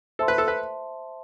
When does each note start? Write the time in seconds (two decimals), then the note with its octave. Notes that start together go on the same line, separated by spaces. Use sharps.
0.19 A4 C5 E5 A5 C6
0.28 B4
0.38 A4
0.48 B4